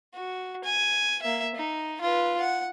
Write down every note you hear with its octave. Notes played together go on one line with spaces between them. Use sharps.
F#4
G#5
A#3 E5
D#4
F4 B4
F#5